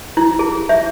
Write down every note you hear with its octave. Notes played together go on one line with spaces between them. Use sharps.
E4
G#4
E5